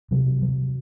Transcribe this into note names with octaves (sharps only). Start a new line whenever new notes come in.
C3 F#3
F#3